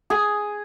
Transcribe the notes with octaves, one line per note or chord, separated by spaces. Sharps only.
G#4